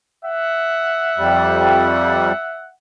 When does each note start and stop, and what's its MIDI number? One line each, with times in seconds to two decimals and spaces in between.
0.25 2.67 76
0.25 2.67 78
1.18 2.32 41
1.18 2.32 55